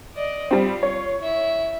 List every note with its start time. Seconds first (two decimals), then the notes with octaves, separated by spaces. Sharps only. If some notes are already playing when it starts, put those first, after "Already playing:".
0.15 D5 D#5
0.51 G3 C4 F4
0.83 C#5
1.19 E4 E5